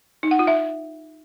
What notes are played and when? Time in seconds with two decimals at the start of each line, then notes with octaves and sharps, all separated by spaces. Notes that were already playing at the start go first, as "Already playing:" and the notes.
0.23 D#4
0.31 F#5
0.39 F4
0.47 E5